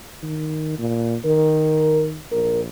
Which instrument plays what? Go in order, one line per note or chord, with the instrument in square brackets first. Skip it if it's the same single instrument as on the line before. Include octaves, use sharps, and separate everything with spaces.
[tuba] D#3
A#2
[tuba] D#3 [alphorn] A#4
[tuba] A#1 [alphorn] A#4